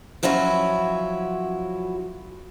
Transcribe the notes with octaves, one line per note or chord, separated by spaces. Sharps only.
F3 F#3 C#4 E4 F#4